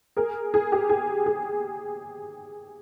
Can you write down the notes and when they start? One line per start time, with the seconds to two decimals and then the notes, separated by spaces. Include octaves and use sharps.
0.17 G#4 A#4
0.54 G#4
0.72 G4
0.89 G#4
1.26 G#4